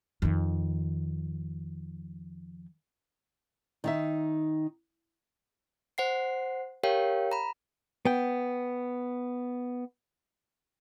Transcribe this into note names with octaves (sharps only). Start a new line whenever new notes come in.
F2 D#3
D#3 D#4 E5
C5 F#5 C7
G4 A#4 C#5 F5 G5
A#5 B5
B3 G5